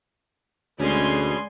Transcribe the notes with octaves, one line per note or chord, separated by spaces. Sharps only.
D2 B2 G#3 C#4 D5 G#5 C6